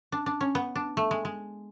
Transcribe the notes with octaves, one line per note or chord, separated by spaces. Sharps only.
D4
D4
C#4
B3
D4
A3
G#3
G#3